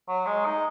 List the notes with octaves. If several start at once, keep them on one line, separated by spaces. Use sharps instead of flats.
F#3
G#3
D#4